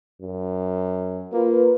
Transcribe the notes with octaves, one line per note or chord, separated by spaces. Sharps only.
F#2
A#3 F4 B4